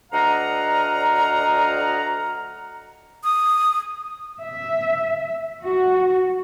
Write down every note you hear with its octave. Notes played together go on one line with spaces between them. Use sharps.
D2 D4 D#5 F5 F#5 A#5
D#6
E5
F#4